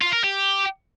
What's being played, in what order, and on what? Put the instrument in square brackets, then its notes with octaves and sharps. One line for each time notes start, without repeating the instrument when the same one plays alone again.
[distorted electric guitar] F4
A#4
G4